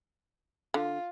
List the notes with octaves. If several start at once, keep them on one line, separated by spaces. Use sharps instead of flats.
D3 F4